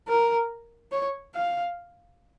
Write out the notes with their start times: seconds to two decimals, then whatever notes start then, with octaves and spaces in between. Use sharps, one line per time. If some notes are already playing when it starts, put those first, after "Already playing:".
0.08 A#4
0.92 C#5
1.35 F5